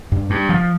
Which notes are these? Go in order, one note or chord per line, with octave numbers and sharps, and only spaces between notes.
G2
G2
F3